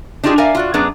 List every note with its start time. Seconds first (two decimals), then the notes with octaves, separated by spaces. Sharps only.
0.24 D4 D#4 F4 G4 G#4
0.38 A#4 D5 E5 F5 G#5 A#5
0.55 F4 F#4 D5
0.74 F#2 B3 D4 G#4 D5 A#5